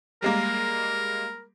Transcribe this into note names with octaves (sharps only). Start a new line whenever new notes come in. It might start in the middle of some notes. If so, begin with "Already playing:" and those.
G3 G#3 A#3 A#4